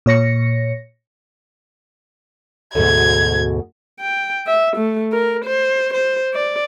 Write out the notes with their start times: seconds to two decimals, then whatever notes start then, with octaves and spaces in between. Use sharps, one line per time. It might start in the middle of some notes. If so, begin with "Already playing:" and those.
0.06 A#2 C#5 A#6 C#7
2.75 D2 G#2 B2 G#6
4.00 G5
4.47 E5
4.77 A3
5.12 A#4
5.45 C5
5.94 C5
6.34 D5